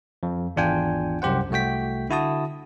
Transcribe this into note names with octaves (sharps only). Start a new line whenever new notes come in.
F2
G#1 E2 D4 F4 G5 G#5
C2 F#2 G4 C5 F#5
C2 A3 F#4 G5 B6
D3 E4 F#4 A5 D#6